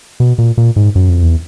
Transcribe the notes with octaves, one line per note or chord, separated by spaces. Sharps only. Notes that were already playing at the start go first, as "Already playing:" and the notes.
B2
A#2
A#2
G#2
F#2
F2
E2